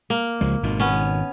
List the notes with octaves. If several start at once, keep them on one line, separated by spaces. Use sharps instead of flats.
A#3
C#2 F3 G#3
G#1 B2 D#3
B3 C#4